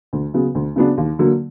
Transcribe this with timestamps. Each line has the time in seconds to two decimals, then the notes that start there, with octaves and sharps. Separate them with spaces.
0.13 D2
0.34 C#3 F#3 B3
0.55 D2
0.76 C#3 F#3 B3 D4
0.97 D#2
1.19 D3 F#3 A#3